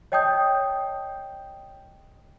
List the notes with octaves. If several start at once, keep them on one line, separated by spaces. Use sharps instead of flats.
C#5 D#5 G5 A5 D#6 G6